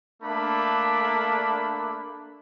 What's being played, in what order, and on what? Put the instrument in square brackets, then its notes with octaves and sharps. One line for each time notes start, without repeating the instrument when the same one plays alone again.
[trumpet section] A3 A#3 D4 B5